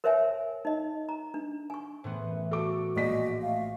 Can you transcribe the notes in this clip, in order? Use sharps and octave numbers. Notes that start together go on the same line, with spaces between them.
A#4 C5 C#5 E5 G5 G#5
D#4 D#5
A#5
D4
G#5 C#6
A2 E3 B3 C5
F#2
F#4 A4 D6
A#1 D5 D#5 B6
A3 F5